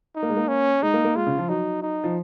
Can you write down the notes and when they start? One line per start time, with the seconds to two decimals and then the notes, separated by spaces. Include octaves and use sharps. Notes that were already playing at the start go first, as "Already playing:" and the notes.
0.15 D#4
0.23 A#3
0.30 G#3
0.37 A#3
0.48 C#4
0.82 G#3 D#4
0.94 A#3
1.05 A#3
1.16 G#3 F4
1.27 C#3
1.38 F3
1.49 F#3 D#4
1.82 D#4
2.04 F3